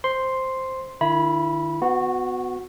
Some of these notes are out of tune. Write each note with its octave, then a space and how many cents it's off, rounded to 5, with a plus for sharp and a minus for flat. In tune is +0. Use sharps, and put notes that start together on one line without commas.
C5 +0 C6 +0
D#3 -30 E4 +30 B5 -20
B3 +25 F#4 -15